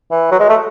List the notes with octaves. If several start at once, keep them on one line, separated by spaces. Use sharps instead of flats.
E3
F#3
G#3
A3